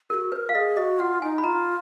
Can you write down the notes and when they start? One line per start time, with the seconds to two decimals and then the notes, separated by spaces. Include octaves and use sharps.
0.10 G#4 A#4
0.14 F#4
0.32 B4 C5
0.36 A#4
0.49 F5
0.55 G#4 D#5
0.77 F#4 D#5
0.99 F4 F#5
1.22 D#4 G#5
1.38 B5
1.44 F4 A#5